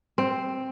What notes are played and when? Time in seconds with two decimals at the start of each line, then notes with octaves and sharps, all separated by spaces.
0.18 C4